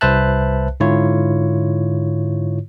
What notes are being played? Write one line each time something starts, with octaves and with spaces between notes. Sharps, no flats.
C2 B4 C5 E5 A5 F#6
G#2 D3 E4 F4 C#5